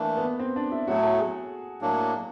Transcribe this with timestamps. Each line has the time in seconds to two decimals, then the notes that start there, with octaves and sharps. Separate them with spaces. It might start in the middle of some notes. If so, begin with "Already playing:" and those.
Already playing: E3 A3 A#3 D4
0.17 B3
0.39 C4
0.56 D4
0.72 E4
0.87 A2 F#3 A3 F#4
1.03 A4
1.19 G#4
1.81 A2 F#3 A#3 D4